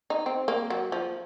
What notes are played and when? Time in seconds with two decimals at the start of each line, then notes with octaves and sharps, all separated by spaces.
0.10 D#4
0.26 C4
0.48 A#3
0.70 F#3
0.92 F3